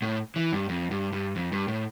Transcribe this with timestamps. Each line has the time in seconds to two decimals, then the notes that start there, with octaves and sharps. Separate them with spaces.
0.02 A2
0.36 E3
0.53 G2
0.69 F2
0.91 G2
1.12 G2
1.36 F2
1.52 G2
1.68 A2